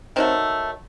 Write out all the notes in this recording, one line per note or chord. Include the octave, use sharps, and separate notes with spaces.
D#3 F#3 A3 C4